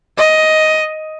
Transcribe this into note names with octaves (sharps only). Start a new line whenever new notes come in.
D#5